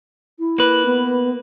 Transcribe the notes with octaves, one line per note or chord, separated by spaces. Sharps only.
E4
A#3 B4
B3